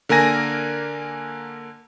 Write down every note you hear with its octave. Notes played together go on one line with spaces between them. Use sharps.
D3 A#3 A#4 G#5 A#6